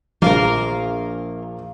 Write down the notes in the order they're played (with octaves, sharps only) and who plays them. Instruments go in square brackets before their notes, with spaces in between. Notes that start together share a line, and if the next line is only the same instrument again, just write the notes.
[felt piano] A#1 [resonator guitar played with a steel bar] A#3 A#4 [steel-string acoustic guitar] F4 F5